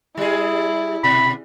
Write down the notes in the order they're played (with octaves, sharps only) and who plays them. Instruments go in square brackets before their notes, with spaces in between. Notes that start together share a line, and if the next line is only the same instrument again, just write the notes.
[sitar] G3 G#4 [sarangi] E4
[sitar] B2 [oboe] B5